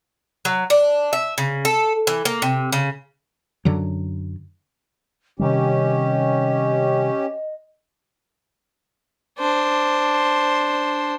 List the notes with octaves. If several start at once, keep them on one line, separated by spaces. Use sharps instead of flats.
F#3
D4
E5
C#3
A4
E3
A#3
C3
C#3
F#2 D3 F#3
C3 D#3 G3 C#4 G4 D#5
D4 C5